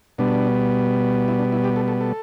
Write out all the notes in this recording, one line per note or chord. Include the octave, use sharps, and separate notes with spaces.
B2 G3 B3 D4
E4
D4
E4
G4
A4
A4
A4